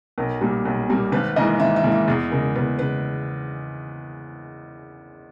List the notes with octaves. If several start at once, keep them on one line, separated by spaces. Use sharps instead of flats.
B1 A#4
A#2 G3 A#3
B1
A#2 G3 A#3
G#1 B4
G#2 E3 A#3 D#5
G#1 E5
E5
G#2 E3 A#3
E5
E2 G#4
C#3 G#3 A#4
E2 B4
C#3 G#3 B4